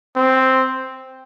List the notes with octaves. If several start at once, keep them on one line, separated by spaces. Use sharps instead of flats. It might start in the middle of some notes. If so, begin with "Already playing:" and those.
C4